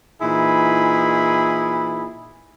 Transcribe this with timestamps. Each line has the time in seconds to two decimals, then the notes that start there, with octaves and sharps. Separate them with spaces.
0.22 A#2 E3 D#4 E4 G#4 B5